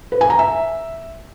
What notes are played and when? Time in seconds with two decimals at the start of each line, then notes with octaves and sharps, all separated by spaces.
0.12 B4
0.21 G#5
0.30 A#5
0.39 E5